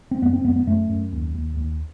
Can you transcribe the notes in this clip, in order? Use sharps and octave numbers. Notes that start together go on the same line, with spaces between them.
C4
F#2 B3
C4
F#2 B3
B3
F#2 A3
F#2
D#2
D#2
D#2